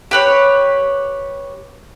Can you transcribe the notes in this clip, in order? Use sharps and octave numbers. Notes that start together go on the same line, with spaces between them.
G4 B4 C#5